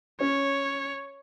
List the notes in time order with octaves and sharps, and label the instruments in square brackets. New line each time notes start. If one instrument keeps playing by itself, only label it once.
[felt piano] C#4 [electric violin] C#5